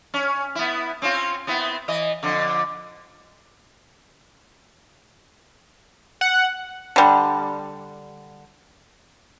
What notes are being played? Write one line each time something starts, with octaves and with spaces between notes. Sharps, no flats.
C#4
B3 E4
C4 C#4 F4
B3 C4 E4
E3 D#5
F2 D3
F#5
D3 G3